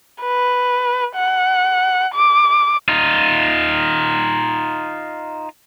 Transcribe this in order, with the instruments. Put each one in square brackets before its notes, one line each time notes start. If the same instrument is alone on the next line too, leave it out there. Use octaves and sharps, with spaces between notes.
[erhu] B4
F#5
D6
[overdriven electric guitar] D#4 F4